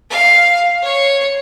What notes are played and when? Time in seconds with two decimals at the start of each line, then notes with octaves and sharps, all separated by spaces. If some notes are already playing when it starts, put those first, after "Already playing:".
0.10 F5
0.83 C#5